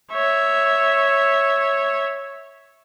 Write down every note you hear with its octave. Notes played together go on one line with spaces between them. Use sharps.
C#5 E5